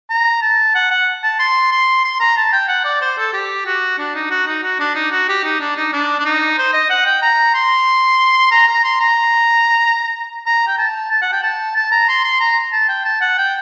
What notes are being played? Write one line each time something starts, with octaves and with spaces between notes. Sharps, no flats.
A#5
A5
F#5
F#5
A5
C6
C6
C6
A#5
A5
G5
F#5
D5
C5
A4
G4
F#4
D4
D#4
F#4
D#4
F#4
D4
D#4
F#4
G4
D#4
D4
D#4
D4
D4
D#4
C5
D#5
F#5
G5
A#5
C6
A#5
A#5
C6
A#5
A#5
G5
A5
A5
F#5
G5
A5
A5
A#5
C6
C6
A#5
A5
G5
A5
F#5
G5